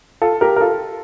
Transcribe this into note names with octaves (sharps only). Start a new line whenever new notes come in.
F4 A4
G4 A#4
A#4
F4 A4